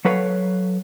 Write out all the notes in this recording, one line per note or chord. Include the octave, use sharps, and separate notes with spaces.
F#3 A4 B4 C#5 F5